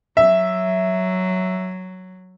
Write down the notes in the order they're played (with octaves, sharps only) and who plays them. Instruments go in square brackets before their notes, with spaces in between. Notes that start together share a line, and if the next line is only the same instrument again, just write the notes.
[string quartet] F#3 [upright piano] E5